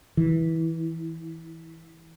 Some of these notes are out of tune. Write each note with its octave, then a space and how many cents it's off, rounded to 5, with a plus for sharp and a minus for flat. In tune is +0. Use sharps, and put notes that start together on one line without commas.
E3 -15